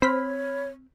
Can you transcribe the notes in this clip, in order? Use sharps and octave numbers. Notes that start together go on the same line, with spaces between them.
C4 C5 C#5 B5 F6 B6